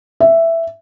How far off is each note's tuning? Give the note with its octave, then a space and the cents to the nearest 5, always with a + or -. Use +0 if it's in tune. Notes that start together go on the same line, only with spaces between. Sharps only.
E5 +5